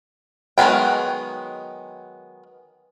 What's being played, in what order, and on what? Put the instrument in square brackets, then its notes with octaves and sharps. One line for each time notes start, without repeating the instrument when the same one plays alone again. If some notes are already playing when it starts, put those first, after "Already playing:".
[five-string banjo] D#3 F#3 G#3 B3 G5